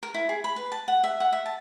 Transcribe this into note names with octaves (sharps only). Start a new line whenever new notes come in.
A#4
E4
G#4
B5
B4
A5
F#5
E5
F#5
E5
A5